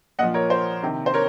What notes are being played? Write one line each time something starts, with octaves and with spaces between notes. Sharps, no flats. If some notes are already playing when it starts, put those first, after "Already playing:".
A#2 F3 D#5 F#5
A#4 C#5
C5
C3 D#3
C5
A#4 C#5